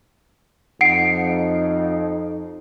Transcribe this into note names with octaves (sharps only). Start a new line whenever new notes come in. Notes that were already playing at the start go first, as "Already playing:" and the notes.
F2 D#4 F#5 C7 D7